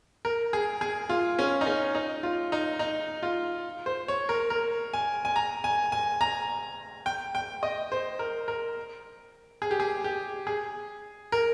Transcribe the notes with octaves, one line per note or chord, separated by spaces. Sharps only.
A#4
G#4
G#4
F4
C#4
D#4
C#4
D#4
F4
D#4
D#4
F4
C5
C#5
A#4
A#4
G#5
G#5
A#5
G#5
G#5
A#5
G5
G5
D#5
C5
A#4
A#4
G#4
G4
G#4
G4
G#4
A#4